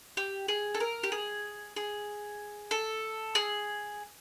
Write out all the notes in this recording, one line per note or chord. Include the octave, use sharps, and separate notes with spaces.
G4
G#4
A4
A#4
G4
G#4
G#4
A4
G#4